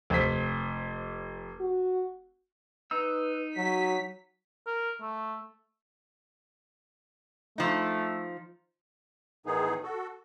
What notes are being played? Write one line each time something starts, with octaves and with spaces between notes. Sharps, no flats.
F1 C5 B6
F#4
D#4 B4 E6
F#3 F#4 B6
A#4
A3
F3 A3 D#4
A2 D#3 E3 B3 D#4 G#4
F#4 A4